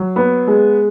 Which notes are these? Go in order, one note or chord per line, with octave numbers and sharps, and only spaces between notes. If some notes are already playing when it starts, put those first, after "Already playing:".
Already playing: F#3
B3
G#3